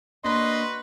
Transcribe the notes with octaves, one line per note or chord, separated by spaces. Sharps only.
A#3 D4 F#4 B4 C#5 D#5 C6